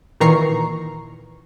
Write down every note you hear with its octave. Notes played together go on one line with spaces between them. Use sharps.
A#2 D#3 E3 A#5 C#6 C7